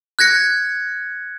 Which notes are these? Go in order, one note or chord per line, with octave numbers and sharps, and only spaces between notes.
F#6 G#6 A#6 C#7